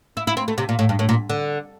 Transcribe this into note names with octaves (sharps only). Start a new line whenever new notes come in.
E4
E4
C4
A3
C3
A#2
A2
G2
A2
A#2
D3